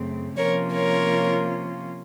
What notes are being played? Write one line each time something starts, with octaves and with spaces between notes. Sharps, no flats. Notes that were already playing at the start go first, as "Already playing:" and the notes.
Already playing: F#2 C#3 A3 C4
C3 F3 A#3 C#4 F4 A#4 C#5
A#4 C#5